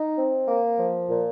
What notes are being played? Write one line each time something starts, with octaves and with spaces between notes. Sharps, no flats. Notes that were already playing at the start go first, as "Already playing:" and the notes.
Already playing: D#4
C4
A#3
F3
A#2